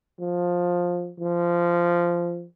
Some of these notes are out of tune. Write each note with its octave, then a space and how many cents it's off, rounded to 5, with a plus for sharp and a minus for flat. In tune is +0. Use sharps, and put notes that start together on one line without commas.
F3 +15
F3 -15